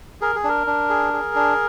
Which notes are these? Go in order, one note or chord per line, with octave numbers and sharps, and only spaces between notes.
G#4 A#4
G#4
D4 A#4
D4
G#4
G#4
D4